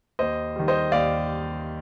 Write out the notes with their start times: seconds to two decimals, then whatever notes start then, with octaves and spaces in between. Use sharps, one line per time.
0.19 D#2 C5 D#5
0.56 D#3 G3
0.68 C5 D#5
0.92 D#2 D5 F5